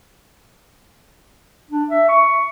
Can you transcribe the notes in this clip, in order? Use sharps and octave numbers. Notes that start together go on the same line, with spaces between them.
D4
E5
C#6